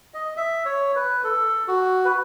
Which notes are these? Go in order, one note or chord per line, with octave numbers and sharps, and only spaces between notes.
D#5
E5
C#5
B4
A4
F#4
B4